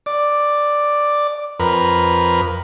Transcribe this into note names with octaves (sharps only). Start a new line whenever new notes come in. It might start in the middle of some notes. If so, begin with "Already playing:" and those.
D5
F2 A#4 B4